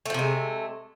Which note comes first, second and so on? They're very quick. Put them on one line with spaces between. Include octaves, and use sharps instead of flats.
A3 F3 C3 G#3